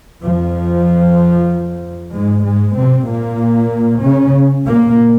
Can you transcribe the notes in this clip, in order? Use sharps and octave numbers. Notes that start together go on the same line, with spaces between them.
F2 F3
G#2 G#3
G#2 G#3
C3 C4
A#2 A#3
C#3 C#4
A#2 A#3